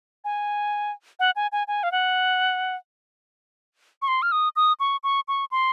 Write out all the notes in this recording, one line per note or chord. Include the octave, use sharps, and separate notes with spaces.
G#5
F#5
G#5
G#5
G#5
F5
F#5
C#6
C6
F6
D#6
D#6
C#6
C#6
C#6
C6